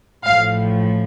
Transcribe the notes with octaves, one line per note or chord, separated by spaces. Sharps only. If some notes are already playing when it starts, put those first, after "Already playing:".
A1 A2 F3 F5